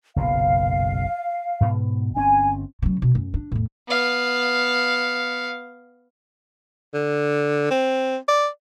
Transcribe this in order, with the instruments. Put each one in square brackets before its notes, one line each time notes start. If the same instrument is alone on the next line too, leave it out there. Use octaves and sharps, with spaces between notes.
[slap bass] F#1 B1 A#2 [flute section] F5
[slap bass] G#2 B2
[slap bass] G1 C4 C#4 [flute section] G#5
[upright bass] C#3 F#3
B2
F#2
D4
E2 A2
[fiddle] B3 F5
[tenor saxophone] D3
C4
D5